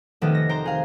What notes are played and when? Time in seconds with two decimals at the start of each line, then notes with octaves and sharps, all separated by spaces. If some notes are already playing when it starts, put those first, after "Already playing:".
0.21 F1 D#3 A3 B3 A4 D#5
0.35 A#6
0.49 C5 A#5 D7
0.66 G#4 F5